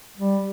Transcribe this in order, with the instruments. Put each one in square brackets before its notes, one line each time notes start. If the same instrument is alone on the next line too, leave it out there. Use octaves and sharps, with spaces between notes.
[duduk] G3